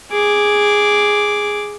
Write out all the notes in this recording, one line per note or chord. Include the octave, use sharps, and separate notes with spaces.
G#4 D6